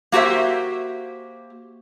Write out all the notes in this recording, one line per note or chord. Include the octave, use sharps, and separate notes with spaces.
A#3 F#4 G4 C5 E5